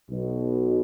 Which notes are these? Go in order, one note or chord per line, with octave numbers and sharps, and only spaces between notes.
B1 B2